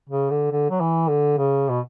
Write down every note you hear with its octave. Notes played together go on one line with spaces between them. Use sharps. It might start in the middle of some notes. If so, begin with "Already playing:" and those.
C#3
D3
D3
F#3
E3
D3
C#3
B2